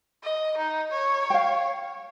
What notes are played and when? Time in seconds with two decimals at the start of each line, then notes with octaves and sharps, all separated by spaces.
0.23 D#5
0.57 D#4
0.92 C#5
1.30 F5 G5